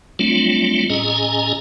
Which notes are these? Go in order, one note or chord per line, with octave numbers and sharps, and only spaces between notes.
F#3 G3 A3 C4 D4 F4
A2 C#4 G#4 D#5 G#5 A#5